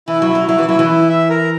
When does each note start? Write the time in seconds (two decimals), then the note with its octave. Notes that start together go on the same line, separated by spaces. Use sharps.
0.08 E3 E4
0.22 F#3
0.29 E4
0.35 F#3
0.48 F#3 E4
0.58 E3
0.69 F#3 E4
0.79 E3
0.89 E4
1.09 E5
1.30 A#4